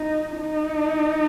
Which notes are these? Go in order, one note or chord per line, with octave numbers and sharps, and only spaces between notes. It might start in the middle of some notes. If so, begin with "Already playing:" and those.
Already playing: D#4
D#4